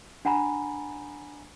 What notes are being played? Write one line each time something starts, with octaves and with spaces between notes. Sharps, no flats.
D4 F#5 G#5 A#5 B5